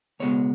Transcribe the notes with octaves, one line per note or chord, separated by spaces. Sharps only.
C#2 B2 G#3 B3 C#5